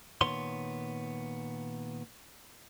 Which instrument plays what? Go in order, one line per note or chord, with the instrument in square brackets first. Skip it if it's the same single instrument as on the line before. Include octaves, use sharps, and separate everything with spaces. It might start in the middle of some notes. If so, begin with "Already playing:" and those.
[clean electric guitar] A#2 D#3 B3 C#5 C6